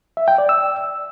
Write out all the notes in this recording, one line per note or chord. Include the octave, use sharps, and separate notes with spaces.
E5
G5
D5
E6